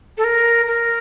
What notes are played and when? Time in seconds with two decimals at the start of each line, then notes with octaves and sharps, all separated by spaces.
0.18 A4
0.24 A#4
0.67 A#4